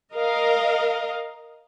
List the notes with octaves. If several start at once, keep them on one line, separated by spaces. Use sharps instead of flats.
A#4 D#5 F5